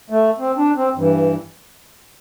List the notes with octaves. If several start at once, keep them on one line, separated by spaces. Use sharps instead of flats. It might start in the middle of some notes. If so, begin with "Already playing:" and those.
A3
C4
D4
C4
G2 E3